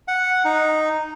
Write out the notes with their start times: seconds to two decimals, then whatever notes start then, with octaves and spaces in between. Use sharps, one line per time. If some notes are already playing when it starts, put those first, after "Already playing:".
0.08 F#5
0.45 D#4